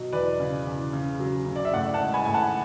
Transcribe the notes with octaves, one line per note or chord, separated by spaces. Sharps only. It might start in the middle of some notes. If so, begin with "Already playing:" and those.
Already playing: B2 F#3
E2 B4 D5
C#3
E2
C#3
F#3
C#3
D5
E5
A2 D5 F#5
F#5 A5
G#3
G#5 B5
A2 G#5
F#5 A5